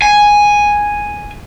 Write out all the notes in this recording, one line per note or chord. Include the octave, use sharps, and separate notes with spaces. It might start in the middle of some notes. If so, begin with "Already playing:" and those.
G#5